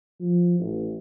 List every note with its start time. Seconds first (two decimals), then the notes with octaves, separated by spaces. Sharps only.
0.20 F3
0.59 A1